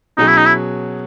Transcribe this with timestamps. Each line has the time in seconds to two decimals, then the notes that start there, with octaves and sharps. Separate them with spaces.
0.18 B2 F#3 C#4 D#4 G#4
0.28 E4
0.37 D#4
0.46 E4